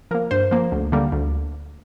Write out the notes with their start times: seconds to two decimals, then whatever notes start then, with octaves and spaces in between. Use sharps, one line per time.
0.11 F3 A#3 A#4
0.31 G2 C5
0.51 F3 A#3
0.72 D2
0.92 D3 G3 A#3
1.12 D2